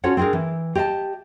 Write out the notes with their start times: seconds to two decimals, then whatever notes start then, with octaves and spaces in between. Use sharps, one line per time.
0.04 C#4 F4 F#4 A4 C#5 F#5
0.17 C4 D4 F#4 G#4 A#4
0.33 E3
0.75 G4 D#5 F5 A5